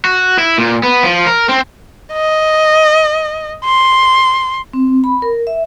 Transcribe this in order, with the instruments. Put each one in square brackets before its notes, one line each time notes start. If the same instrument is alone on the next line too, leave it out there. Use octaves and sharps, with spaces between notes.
[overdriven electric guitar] F#4
E4
A#2
B3
F3
A#4
C4
[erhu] D#5
C6
[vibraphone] C4
B5
A#4
E5